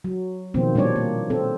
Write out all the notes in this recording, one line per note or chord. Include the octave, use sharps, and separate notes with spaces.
F#3
B2 D#3 F3 A#3 C4
A#2 G3 C4 D4 C#5 D5
A#3
C4 A4